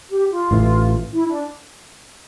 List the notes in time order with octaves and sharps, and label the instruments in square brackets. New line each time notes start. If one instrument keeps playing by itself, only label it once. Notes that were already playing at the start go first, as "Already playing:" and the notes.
[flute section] G4
F4
[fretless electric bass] A1 A2 E3
[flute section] E4
D4